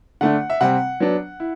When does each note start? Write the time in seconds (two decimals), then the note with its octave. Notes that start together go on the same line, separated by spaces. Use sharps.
0.21 D3 A3 D4 F#5
0.50 E5
0.61 C3 G3 C4 F#5
1.00 F#3 B3 D4
1.40 E4